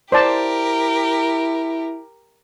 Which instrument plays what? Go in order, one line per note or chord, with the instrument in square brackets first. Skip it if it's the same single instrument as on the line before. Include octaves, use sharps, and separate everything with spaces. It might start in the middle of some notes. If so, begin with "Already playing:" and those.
[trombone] E4 [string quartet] G4 A#4 [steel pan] C5 D5 A5